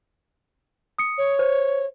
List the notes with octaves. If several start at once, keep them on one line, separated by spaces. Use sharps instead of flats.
D#6 C#7
C#5
C5